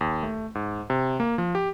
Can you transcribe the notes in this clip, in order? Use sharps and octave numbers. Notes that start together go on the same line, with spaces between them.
D#2
A3
G#2
C3
A#3
F3
G4